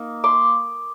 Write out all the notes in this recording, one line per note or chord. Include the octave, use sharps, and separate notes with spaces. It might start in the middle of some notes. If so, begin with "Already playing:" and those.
Already playing: A#3 D#4
C6 D6